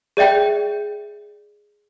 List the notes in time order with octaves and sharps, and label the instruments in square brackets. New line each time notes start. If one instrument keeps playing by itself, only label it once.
[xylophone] G#4 D5 E5 G5 G6